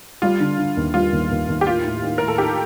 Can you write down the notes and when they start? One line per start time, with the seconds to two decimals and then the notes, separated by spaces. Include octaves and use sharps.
0.22 G3 F4
0.40 D3
0.58 D3
0.77 D#2
0.94 G3 F4
1.13 D#2
1.31 D#2
1.48 D#2
1.61 G4
1.67 A2 F4
1.84 A2
2.03 D#4
2.18 A2 A#4
2.28 A4
2.38 D#4 G4